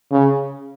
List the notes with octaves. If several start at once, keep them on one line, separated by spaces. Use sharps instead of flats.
C#3